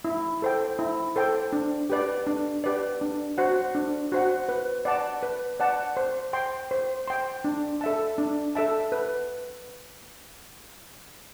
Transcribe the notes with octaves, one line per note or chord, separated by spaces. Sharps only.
E4
A4 C5 G5
E4
A4 C5 G5
D4
G4 B4 D5
D4
G4 B4 D5
D4
F#4 C5 F#5
D4
F#4 C5 F#5
B4
D5 F#5 A5
B4
D5 F#5 A5
C5
G5 C6
C5
G5 C6
D4
A4 E5 A5
D4
A4 E5 A5
B4